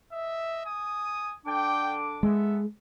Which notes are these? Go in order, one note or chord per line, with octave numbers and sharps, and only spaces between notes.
D#5 E5
G#5 D#6
D3 D4 G5 D6
G#3 B3 A4 E5